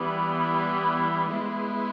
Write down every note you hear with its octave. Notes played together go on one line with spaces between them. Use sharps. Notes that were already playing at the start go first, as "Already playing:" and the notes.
Already playing: E3 G3 B3
G#3 B3 E4